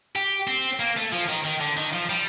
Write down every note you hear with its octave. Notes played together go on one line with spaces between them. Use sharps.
G4
C4
A#3
A3
F3
D#3
D#3
D3
D#3
F3
G3